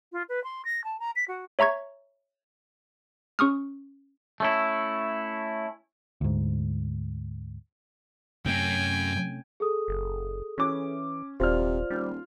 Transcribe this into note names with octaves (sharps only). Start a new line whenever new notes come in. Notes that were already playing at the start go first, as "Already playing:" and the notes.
F4
B4
C6
A#6
A5
A#5
B6
F#4
C#5 E5 A#5 C#6 G#6
C#4 C#6 D#6 F6
A3 C#4 E4
D2 G#2
F#2 C3 A3 C#4 G5 G#5
G#4 A4 D#6
F#1
E3 C#4 D6
D#1 C3 F4 C5 D5 F6
D#1 G3